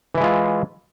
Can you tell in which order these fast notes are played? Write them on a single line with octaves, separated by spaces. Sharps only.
E3 E4 G#3 F4